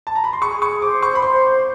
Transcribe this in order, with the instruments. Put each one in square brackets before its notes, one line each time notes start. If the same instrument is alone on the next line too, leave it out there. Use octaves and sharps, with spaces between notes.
[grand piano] A5
A#5
B5
C6
[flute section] G#4 [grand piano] C#6
[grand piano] C#6
[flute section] C5 [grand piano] D6
[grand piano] C#6
B5
[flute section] C5 [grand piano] C6